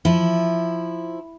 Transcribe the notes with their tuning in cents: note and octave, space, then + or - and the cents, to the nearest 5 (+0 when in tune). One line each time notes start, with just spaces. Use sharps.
F3 +0 E4 +0